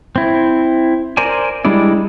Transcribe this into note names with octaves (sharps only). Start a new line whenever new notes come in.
C4 E4
A#4 C5 D5 G#5
G3 G#3 D4 E4 D5